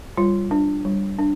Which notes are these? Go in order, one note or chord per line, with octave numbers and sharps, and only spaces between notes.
G3 F4
D4
G3
D4